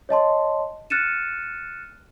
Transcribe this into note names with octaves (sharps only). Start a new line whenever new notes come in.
C#5 D#5 A5 C6
F6 F#6 A6 C#7 D#7 E7